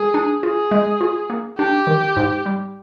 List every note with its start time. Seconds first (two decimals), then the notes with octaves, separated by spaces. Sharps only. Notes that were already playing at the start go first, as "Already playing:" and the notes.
Already playing: G#3 G#4
0.14 D4
0.43 F4 G#4
0.71 G#3
1.01 F4
1.30 A#3
1.59 D4 G4
1.87 D#3
2.16 G#2
2.46 G3